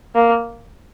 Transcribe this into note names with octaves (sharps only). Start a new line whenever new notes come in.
A#3